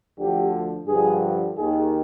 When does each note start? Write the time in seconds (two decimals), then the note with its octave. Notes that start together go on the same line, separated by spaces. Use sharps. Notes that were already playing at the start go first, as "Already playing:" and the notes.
0.19 D2 D3 F3 G4
0.88 G2 D3 F3 G#4
1.56 D#2 D#3 G#4